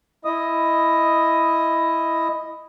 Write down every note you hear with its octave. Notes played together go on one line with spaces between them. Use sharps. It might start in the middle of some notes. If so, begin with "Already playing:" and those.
E4 D#5 D#6